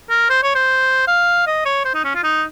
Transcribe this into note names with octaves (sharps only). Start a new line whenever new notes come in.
A#4
C5
C#5
C5
F5
D#5
C#5
C5
D#4
C#4
F4
D#4